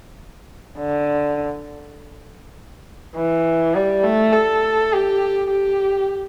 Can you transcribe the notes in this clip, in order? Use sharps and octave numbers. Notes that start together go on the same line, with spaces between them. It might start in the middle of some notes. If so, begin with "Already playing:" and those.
D3
E3
G3
A3
A4
G4
G4